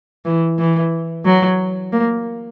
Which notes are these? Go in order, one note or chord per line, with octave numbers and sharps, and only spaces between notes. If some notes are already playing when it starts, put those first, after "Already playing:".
E3
E3
F#3
A#3